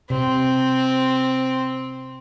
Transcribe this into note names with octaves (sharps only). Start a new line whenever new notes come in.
C3 C4